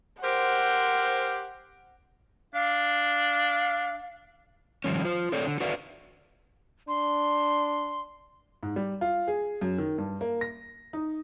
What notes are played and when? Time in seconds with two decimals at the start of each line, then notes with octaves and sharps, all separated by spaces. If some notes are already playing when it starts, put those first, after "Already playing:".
0.22 G4 A#4 C5 F#5
2.54 D4 F5
4.84 D#3 F3 G3 C#4
5.05 F4 C5
5.32 A3 C4 A4 C#5 D5
5.46 D3
5.60 F#4 A4 B4 D5 E5 F5
6.88 D4 C6
8.63 G#2
8.76 G3
9.01 F4
9.28 G#4
9.61 F#2
9.78 D#3
9.98 G2
10.21 A#3
10.41 A#6
10.93 D#4